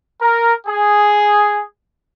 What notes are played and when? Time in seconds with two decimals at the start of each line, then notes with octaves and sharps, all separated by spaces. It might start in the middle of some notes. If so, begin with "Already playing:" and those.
0.21 A#4
0.67 G#4